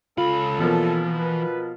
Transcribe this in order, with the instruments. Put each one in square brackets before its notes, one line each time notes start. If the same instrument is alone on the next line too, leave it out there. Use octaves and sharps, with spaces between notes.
[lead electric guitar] C#2 B5 [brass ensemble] C#4 A4 [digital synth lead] F4
[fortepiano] B2 F3 A#3 [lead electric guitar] E3
[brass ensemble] B4